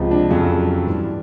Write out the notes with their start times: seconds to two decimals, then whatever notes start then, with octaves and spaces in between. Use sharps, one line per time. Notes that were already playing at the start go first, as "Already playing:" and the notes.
Already playing: C#2 C3 F3
0.11 D4
0.30 F2 C#3 F#3
0.87 G2 E3 G3